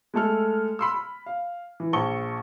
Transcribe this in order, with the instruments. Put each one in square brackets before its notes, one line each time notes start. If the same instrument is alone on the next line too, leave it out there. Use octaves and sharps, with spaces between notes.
[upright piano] G#3 A3 A4 F6
B5 C6 E6
B5
F5
E3
A#1 A5 C#6 G7